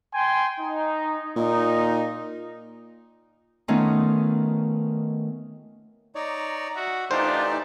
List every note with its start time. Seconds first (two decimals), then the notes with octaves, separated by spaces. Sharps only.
0.12 G5 G#5 C6
0.59 D#4
1.36 A#2 D#4
3.68 D#3 A3 B3 C#4 D#4 F4
6.15 D#4 C#5 D5 A#5
6.76 F#4 E5
7.11 E3 A3 D4 D#4 F4 G4 C5 D5